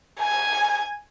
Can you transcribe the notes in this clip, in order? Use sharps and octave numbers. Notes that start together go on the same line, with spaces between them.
G#5